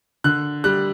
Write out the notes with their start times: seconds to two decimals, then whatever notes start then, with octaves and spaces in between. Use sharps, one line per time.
0.24 D3 F#6
0.64 G3 F#6